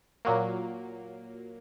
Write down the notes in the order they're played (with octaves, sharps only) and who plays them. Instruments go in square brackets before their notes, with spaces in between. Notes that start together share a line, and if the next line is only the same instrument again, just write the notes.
[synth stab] A#2 F#3 A#3